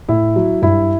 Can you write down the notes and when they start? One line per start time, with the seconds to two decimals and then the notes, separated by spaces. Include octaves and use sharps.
0.08 A2 E4
0.36 F#3
0.62 G2 E4